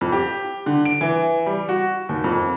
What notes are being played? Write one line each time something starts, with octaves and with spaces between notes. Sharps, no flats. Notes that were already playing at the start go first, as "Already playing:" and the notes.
F2
G4
D3
D7
E3
G3
F#4
D#2
F2